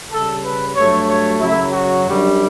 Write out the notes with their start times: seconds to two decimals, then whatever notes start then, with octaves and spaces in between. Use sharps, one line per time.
0.12 C#3 G3 A4
0.44 B4
0.76 G2 F#3 A3 C#5
1.09 C#5
1.40 F#2 C#3 F#3 E4
1.73 F#4
2.05 F#2 D3 G3